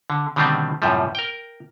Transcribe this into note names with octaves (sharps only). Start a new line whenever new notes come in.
D3
B2 D3 D#3 G3 A3 C4
F#2 A2 C3 F3 G3
A#4 G5